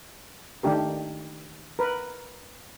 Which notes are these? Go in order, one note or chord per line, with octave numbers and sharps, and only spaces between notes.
D#3 A3 D4 G4 A#4
A#4 B4